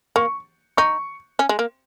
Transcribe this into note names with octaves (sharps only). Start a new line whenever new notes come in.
A#3 C#6
D#4 C#6
C#4
G#3
A#3